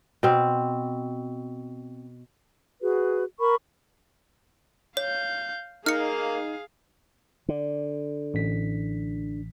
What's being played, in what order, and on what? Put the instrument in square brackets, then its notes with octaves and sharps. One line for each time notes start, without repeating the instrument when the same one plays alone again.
[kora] B2 C4
[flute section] F#4 G#4 B4
A#4 B5 C#6
[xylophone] C#5 [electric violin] F5 G6
[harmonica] A#3 A#4 [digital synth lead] D#4 [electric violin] G#4 F5 [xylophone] F6 C#7
[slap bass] D3
[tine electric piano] A1 B6